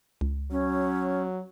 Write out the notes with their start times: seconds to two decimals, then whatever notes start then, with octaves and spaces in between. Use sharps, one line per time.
0.21 C#2
0.51 F#3 C#4